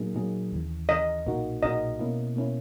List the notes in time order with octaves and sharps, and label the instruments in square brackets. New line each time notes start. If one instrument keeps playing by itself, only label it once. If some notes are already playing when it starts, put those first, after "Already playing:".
Already playing: [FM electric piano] A#2 F#3 A#3 D#4 G#4
A#2 F#3 A#3 D#4 G#4
D#2 C#3 E3
[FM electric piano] D#2 C#3 E3 [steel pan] D#5
[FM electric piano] B1 A#2 A#3 D#4 F#4
[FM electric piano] B1 A#2 A#3 D#4 F#4 [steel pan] D#5
[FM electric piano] B2 A#3 C#4 E4
B2 A#3 C#4 E4